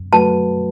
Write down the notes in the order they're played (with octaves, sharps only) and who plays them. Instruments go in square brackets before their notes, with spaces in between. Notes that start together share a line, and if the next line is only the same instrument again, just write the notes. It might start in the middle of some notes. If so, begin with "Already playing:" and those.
Already playing: [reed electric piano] F#2
[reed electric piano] F#3 A3 F#4 B4 [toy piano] A5